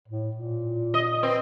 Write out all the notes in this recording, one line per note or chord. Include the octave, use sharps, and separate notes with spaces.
A2
A#2
D#5
C4 B4